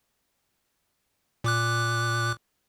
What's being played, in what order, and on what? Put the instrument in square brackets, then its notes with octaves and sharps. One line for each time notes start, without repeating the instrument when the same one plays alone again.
[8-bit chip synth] A#2 D6 F#6